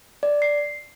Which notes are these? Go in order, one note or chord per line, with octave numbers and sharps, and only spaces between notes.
D5
C7